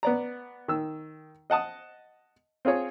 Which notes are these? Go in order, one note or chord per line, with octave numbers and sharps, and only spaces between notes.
B3 D5 A#5
D#3 E6
D#5 F#5 A5 D#6
C4 F4 G#4 C#5